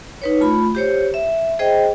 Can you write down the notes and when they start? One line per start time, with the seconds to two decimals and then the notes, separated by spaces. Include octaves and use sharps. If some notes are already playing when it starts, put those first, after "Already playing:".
0.22 D#4 B4 C#5
0.41 A3 F4 B5
0.75 G4 C5 C#5
1.14 E5
1.59 G#4 C5 D#5 G5